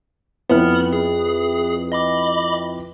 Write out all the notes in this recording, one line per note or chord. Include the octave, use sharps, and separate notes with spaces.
F2 B3 E4 B4 B5 F6
G#4
D#5 B5 D6